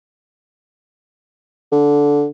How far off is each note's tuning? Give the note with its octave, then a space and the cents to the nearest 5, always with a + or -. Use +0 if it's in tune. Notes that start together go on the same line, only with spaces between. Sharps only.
D3 -10